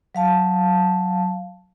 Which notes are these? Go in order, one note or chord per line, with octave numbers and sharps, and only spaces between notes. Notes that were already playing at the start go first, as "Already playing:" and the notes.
F#3 F5 A5